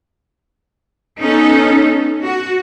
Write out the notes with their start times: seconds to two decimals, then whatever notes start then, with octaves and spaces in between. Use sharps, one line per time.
1.20 B3 C#4 D#4 A4
2.23 F#4